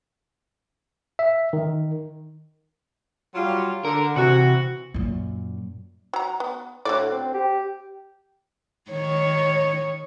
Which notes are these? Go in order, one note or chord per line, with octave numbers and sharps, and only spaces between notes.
E5
D#3
F#3 G3 F4
D3 A#4
C3 E3 F#4
F#2 A#2
F#3 A#5
B3
A2 D3 F#4 D5
C4
G4
D#3 C#5